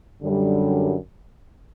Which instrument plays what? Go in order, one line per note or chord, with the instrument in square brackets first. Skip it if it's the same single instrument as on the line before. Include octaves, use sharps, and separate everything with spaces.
[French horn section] F#2 D3 G3